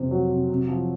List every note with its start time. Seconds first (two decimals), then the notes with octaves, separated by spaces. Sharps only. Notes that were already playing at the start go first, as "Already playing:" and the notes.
Already playing: F2 C3 C5
0.11 F#3
0.30 C3
0.49 C3
0.69 F3